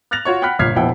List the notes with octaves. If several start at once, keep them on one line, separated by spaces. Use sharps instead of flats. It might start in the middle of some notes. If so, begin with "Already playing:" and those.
F6 F#6 A6 A#6 F7
F4 F#4 C#5 C#6
F#5 G5 B5 F6 F#6 B6
G1 A#2 F6 G#6 B6 C7
F1 A#1 B2 E4 F#5 G5